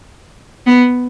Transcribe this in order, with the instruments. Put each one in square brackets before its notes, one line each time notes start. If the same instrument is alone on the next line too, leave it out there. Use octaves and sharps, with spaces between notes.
[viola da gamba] B3